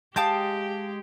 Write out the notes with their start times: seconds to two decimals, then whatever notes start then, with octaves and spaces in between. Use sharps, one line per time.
0.16 G#3 G4 F5 G5 A5 D#6 G6